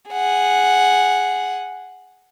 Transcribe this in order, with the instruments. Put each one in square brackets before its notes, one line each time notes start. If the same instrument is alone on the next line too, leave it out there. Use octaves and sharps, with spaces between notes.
[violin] G#4 F#5